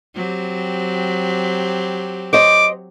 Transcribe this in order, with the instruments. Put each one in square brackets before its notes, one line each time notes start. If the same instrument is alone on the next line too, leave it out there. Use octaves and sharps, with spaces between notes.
[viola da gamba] F#3 C4 G4
[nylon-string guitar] C5 C#5 D#5 [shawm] D6